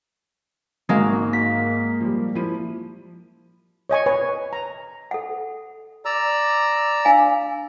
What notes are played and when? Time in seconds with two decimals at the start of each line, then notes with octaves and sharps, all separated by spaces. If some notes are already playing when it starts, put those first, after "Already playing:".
0.89 G#1 G#2 G#3 A#3 F#4
1.33 A#3 B6
2.00 F3 G3
2.35 F3 E4 D#7
3.90 C#5 D#5 G#5 C#6
4.06 B4 C#5 G#5
4.53 A#5
5.11 A4 F#5
6.05 D5 A#5 E6
7.05 D4 F5 G#5